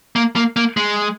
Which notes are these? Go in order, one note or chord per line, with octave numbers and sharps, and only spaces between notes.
A#3
A#3
A#3
G#3